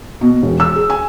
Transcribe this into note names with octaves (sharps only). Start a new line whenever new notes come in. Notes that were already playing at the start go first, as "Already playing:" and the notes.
B2
E1
E6
G#4
G#5